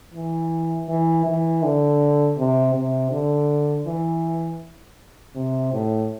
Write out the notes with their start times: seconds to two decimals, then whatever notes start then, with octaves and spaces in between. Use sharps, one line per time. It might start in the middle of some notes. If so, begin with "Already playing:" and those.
0.14 E3
0.89 E3
1.26 E3
1.63 D3
2.38 C3
2.74 C3
3.12 D3
3.87 E3
5.35 C3
5.73 A2